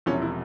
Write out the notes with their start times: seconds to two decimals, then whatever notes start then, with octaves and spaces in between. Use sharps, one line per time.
0.06 E1 E2 C3 F3 C#4
0.22 E4